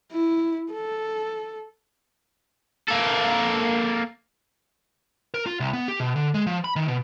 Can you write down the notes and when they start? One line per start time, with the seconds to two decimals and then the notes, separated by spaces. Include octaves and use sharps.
0.12 E4
0.72 A4
2.88 A#3 A4
5.34 A#4
5.46 F4
5.60 C2
5.73 B3
5.88 G4
6.00 B2
6.16 D3
6.34 G#3
6.46 F3
6.64 B5
6.76 D#3
6.88 B2